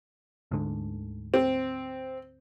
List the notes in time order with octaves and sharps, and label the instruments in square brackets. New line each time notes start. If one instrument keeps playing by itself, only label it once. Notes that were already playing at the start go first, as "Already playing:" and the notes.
[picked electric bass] D2 G#2 D3
[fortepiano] C4